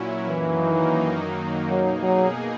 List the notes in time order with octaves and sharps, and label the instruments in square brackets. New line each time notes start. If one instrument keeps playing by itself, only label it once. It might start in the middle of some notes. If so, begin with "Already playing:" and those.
Already playing: [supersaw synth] A#2 F#3 C#4 E4
[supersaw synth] F#2 D#3 F#3 A#3 D#4 [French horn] E3
[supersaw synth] B2 A#3 D#4 G#4 [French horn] F#3
[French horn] F#3